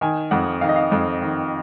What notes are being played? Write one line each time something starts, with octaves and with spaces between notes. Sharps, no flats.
D#3 G#5
F2 F#5
D#3 F5
D#5
F5
F2
D#3